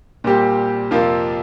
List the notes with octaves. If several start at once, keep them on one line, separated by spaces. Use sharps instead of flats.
A#2 G3 C4 G4
F2 C3 F3 A#3 F4